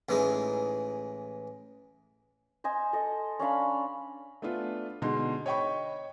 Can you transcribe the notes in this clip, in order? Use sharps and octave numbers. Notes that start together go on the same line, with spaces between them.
A1 E3 G#3 D#4
C5 D#5 G#5
A4 D#5
C#4 D4 F5 B5
A3 B3 D4 F4
B2 D3 G#3 D#4 C6
C#5 D#5 G5 B5 C#6